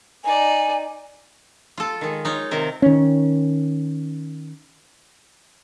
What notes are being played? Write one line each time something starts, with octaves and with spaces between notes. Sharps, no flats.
D#4 D5 G#5
F4 A4
D#3 G#3
D#4 F4 C#5
C3 D#3 C4 A#4
D#3 C#4